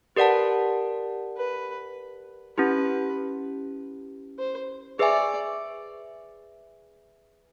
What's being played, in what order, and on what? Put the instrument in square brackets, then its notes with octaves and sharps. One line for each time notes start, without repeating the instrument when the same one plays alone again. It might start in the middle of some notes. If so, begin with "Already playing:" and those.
[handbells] G4 A#4 D5 F#5 A5 [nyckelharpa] B4
[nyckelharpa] B4
[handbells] C#4 E4 G4 [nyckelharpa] B4
[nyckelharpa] C5
[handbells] G#4 B4 E5 G#5 [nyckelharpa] D5